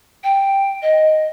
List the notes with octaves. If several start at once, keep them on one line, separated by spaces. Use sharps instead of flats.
G5
D#5